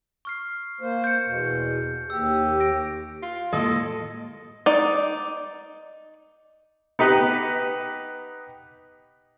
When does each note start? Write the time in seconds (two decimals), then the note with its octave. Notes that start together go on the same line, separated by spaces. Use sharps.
0.25 C#6 F6 C7
0.81 A#3 C5
1.04 G6 C#7
1.26 E2 B2
2.10 D#2 G4 E6
2.60 A#6 D7
3.22 F4
3.53 A2 G#3 A#3 A4 D#5
4.66 D#4 D5
6.99 B3 D#4 G4 B4